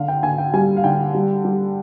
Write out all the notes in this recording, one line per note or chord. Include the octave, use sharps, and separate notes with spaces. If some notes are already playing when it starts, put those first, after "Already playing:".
Already playing: D3 F5
G5
D3 G#5
G5
G3 G#5
F5
D3 G5
G3
G3